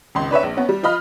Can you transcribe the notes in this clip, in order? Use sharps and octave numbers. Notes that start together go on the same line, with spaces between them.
G#1 C#2 C6
D4 B4 C#5 E5
A#1
B3 C#4
G3
F3 F4 D#5 B5 F6